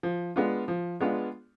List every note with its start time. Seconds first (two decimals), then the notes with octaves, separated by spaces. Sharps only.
0.03 F3
0.36 G#3 B3 D4 F4
0.68 F3
1.00 G#3 B3 D4 F4